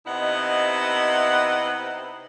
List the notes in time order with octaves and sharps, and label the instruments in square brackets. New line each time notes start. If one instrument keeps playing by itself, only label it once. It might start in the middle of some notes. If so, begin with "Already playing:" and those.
[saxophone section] C3 B3 D#4 E4 D#5 F#5